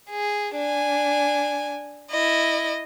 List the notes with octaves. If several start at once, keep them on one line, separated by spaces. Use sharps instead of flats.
G#4
D4 G#5
E4 D#5